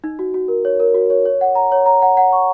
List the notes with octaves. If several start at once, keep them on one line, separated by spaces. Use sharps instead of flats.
D#4
F#4
F#4
A#4
C#5
A#4
F#4
C#5
C#5
F#5
A#5
C#5
A#5
F#5
F#5
C#6